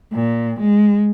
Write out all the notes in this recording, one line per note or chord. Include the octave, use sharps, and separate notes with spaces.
A#2
G#3